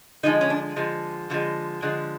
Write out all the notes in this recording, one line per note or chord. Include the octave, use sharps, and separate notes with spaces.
D3 F3 G#3 D#4
C#4
D4
D3 F3 G#3
D3 F3 G#3
D3 F3 G#3